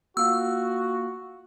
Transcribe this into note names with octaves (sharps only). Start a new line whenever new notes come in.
A#3 F4 F#4 F5 E6